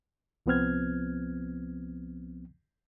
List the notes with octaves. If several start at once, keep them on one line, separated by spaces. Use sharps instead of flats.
C2 F3 B3 C4 F6 G#6